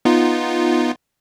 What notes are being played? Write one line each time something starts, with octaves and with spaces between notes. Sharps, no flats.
B3 D#4 F4